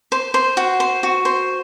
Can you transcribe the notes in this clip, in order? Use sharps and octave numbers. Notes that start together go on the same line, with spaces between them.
C5
C5
F#4
C5
F#4
C5